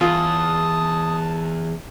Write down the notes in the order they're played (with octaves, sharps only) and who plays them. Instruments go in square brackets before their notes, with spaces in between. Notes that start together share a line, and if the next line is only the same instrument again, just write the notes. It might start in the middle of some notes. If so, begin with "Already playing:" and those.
[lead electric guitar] E2 [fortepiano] F4 [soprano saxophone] A5 [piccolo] D#6